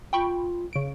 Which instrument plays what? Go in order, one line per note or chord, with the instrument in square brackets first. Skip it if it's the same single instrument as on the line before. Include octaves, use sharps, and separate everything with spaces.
[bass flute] F4 [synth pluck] G5 B5 C#6
[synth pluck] C#3 D7